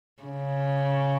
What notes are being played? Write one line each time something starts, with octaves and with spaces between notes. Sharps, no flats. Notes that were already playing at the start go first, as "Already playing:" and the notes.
C#3